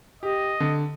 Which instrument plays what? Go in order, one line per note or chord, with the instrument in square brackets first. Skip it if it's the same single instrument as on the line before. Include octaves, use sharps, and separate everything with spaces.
[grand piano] G4 [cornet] D#5
[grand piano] D3